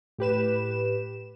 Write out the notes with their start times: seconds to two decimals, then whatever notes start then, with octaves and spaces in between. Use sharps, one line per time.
0.18 A2 G4 B4 E7